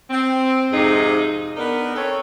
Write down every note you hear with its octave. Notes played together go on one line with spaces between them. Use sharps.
C4
F2 G#2 C3 D#4 G#4
B3 D4 D#4 A#4
C4 A4 C#5